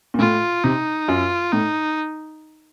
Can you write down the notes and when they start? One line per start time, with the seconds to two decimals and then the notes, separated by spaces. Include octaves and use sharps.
0.14 A#2
0.19 A2 F4
0.64 C3 D#4
1.08 F#2 F4
1.52 A2 D#4